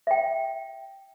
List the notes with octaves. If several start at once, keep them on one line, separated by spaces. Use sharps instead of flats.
E5 G5